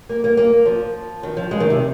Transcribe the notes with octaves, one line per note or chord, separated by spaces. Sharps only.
A#3
A#3
A#3
F3
D#3
F3
G#3
D#3
C3